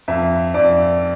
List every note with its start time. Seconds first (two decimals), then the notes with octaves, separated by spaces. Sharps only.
0.08 F2 E5
0.54 F2 D5